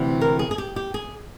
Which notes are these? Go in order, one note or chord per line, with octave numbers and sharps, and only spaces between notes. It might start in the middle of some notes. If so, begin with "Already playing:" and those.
Already playing: D2 C3 E3
A#4
G#4
G#4
G4
G4
G#4